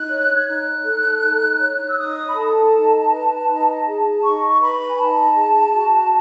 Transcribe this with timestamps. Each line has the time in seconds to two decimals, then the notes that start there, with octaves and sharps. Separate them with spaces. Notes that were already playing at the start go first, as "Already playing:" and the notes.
Already playing: D#4 F#6
0.10 C#5
0.36 G#6
0.47 D#4 F#6
0.85 A4
1.22 D#4
1.59 C#5
1.88 E6
1.97 D#4 D#6
2.28 B5
2.34 A4 A5
2.73 D#4
3.11 B4
3.48 D#4
3.86 G#4
4.22 D#4 C#6
4.48 C#6
4.60 B4 B5
4.89 G#5
4.97 D#4 A5
5.35 G#4
5.73 F#4